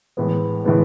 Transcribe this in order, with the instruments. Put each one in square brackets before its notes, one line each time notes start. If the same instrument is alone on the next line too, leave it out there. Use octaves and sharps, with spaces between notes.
[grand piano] A2 E3 G#3 B3
A2 E3 G#3 B3